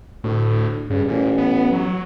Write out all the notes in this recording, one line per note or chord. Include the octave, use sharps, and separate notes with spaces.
D2 A2
G2 C#3
A1 A#2
B3
F#3